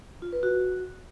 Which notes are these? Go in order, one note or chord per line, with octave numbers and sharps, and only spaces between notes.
F4
B4
F#4